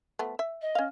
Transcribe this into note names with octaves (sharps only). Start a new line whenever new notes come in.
F3 A3 B3
E5
D#5
C#4 F5